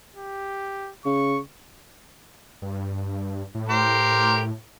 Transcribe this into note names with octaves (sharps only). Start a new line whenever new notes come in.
G4
C#3 C#6
G2
A2
G4 A#4 C5